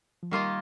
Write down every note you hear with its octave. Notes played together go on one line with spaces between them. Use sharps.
F3
D#3 G3 A#3 F4 D#5